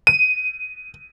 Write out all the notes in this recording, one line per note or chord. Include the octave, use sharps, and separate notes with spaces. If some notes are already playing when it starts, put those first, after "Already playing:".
D#7